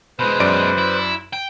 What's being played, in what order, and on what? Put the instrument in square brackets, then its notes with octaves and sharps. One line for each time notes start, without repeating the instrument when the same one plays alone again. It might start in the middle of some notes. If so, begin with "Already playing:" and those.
[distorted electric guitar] B2 G#3 [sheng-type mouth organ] B4 C5
[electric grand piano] F#2 D5 D7
[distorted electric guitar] E4
G5